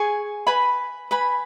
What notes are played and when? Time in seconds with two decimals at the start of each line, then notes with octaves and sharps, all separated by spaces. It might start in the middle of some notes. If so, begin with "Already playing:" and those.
Already playing: G#4 G#5 C#6
0.47 B4 G#5 B5
1.11 B4 G#5 B5